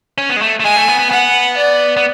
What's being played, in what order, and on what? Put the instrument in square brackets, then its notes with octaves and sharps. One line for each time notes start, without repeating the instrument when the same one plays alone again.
[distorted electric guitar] C#4
B3
G#3
A3
A3
[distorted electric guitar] G#3 [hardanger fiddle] G#5
[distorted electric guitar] A3
B3
B3
[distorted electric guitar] B3 [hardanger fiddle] F#5
[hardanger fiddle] D5
[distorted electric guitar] B3